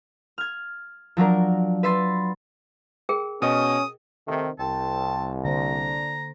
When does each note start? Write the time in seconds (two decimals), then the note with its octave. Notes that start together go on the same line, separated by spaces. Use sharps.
0.38 F6 G#6
1.17 F3 F#3 D4 A#4
1.83 B4 E5 C6 A6
3.09 G#4 A#4 G5
3.42 B2 C#4 F#4 D#5 D#6
4.27 C3 D#3 A3
4.59 C2 C4 A5
5.45 D3 A#3 D4 C5 A#5